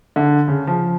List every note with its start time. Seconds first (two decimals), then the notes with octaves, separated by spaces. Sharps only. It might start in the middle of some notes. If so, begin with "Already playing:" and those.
0.16 D3
0.48 C#3
0.67 F3